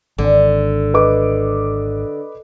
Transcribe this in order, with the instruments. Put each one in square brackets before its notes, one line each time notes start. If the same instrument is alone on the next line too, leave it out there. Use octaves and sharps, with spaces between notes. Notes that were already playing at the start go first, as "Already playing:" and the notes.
[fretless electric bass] G#1 [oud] D3
[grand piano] B4 D#5 D6